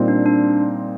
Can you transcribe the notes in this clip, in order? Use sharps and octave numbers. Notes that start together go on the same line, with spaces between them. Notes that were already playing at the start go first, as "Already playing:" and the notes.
Already playing: A#2 G3 C4 D#4
D4
D4